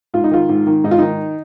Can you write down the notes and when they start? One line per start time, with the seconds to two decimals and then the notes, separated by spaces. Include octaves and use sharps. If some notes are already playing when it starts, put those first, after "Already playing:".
0.14 G#2 F4
0.24 D#4
0.31 D#3 F4
0.49 G#2
0.67 D#3
0.84 G#2 D#4
0.91 F4
0.99 D#3 D#4